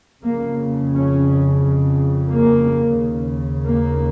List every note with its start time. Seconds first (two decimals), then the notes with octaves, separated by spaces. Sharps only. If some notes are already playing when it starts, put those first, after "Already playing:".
0.24 F2 C#3 A#3
0.93 C#4
2.28 A#3
2.96 D#2 C#3
3.65 A#3